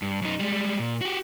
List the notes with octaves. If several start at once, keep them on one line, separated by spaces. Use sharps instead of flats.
G2
F#2 D#4
G3 G#3
A#2
F#4 G4